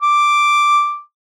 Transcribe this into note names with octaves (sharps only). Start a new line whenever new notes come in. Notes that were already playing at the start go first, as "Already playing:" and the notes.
D6